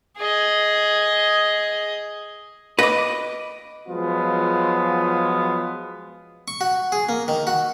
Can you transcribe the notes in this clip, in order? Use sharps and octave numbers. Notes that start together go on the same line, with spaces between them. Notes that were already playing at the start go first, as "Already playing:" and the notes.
G#4 D#5
B4 D#5 D6
F3 F#3 G#3 B3 F4
C#6
F#4
G#4
A#3
D#3
F#4